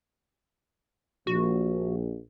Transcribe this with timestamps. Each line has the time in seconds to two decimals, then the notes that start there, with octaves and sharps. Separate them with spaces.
1.27 A#1 F#4